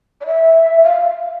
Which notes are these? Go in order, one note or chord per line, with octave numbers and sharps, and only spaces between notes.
D5
E5
F5